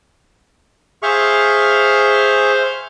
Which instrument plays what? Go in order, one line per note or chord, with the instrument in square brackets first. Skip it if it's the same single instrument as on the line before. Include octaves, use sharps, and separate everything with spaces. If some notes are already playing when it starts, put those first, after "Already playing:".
[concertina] G#4 E5 C#6 [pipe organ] C5 F5